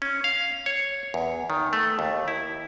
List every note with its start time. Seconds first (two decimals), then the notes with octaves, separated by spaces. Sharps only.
0.02 C#4
0.24 F5
0.66 C#5
1.14 E2
1.50 D#3
1.73 A3
1.99 D#2
2.28 E4